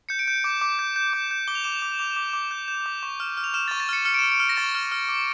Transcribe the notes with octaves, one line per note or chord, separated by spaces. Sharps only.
G6 C#7
D7
G6
D6
D6
G6
G6
D6
G6
D6 G7
F7
D6 E7
F7
D6
D6 F7
D6
D6
G6
G6
D6
C#6
F6
F6
F7
F6 E7
A6
C#6
A6
F6 C#7
F6 C#7
D7
E7
F6
D7
F6
A#6
C#6 A6
F6
F6
D6